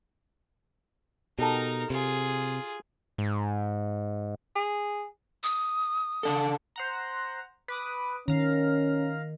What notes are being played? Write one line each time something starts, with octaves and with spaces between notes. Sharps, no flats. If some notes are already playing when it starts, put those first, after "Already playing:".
B2 D#4 G4 A4 A#4
C3 F4 G#4
G#2
G#4
D#6
C#3 D4 A4
C5 F#5 A#5
B4 D6 D#6
D#3 C#4 F5 A#5